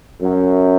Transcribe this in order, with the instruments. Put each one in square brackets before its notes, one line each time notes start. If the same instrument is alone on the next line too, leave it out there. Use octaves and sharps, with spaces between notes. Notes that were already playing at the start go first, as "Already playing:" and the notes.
[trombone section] F#2